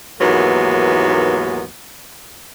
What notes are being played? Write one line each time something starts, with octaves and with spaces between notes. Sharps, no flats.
D#2 G#2 E3 F#3 A#3 B3